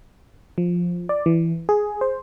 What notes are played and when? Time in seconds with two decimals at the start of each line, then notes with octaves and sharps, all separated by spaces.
0.58 F3
1.09 D5
1.26 E3
1.69 G#4
2.01 C5